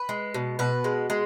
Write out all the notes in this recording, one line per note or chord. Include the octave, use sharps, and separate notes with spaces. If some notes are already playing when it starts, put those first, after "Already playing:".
Already playing: B4
G#3
B2
B2 B4
G#3
G#3